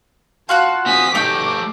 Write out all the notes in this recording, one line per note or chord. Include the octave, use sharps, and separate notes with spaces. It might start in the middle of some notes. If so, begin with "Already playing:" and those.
F4 F#4 F#5 A5
C4 G#5 D#6 B6
A3 D#4 G4 D6